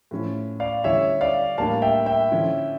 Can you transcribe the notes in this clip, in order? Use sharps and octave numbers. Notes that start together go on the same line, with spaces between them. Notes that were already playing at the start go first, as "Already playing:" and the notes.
A2 F3 C#4 E4
D5 F5
D3 G3 C#4 E4 C#5 E5
D5 F5
A2 G3 A#3 D4 F5 A5
E5 G5
E5 G5
D3 F3 C#4 E4